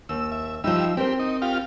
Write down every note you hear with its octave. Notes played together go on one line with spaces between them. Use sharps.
D#2 E6
E5
F3 G3 D#4 E5 E6
C4 G4 A#4 C5
D#4
F4 G4 F5